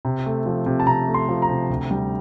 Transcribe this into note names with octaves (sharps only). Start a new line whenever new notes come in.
C3
A3
F3
C3
A5
C3 A#5
A3
C6
F3
A#5
C3
D2
G3